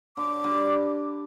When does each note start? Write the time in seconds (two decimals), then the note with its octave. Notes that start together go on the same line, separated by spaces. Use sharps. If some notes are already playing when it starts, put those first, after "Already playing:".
0.17 D3 D6
0.44 D3 G3